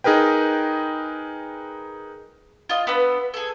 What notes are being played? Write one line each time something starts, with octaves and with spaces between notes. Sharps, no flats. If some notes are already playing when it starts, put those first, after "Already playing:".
D#4 G#4 A#4 B4 G5
F4 D#5
B3 D4 B4 E6
G#4 A4